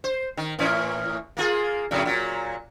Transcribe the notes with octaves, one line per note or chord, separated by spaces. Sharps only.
C5
D#3
A2 E3 C#4
A#3 F4 G#4
F2 A2 C#3
A#2 F#3